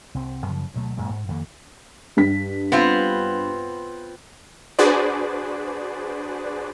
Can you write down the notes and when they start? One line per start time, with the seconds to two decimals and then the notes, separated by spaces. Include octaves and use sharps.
0.14 C2 C4
0.46 F#2 C#3 F3
0.74 D2 B2 F#3 A3
0.97 F#2 A#2 G#3 A#3
1.10 G#2
1.28 F2 D#3 A#3
2.17 G2 B6
2.72 B3 C4 F4
4.79 D4 F#4 G#4 B4 C5 D5